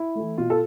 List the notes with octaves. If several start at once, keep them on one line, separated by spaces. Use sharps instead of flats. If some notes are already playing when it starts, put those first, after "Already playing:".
Already playing: E4
E3 A3
B2 F4
A4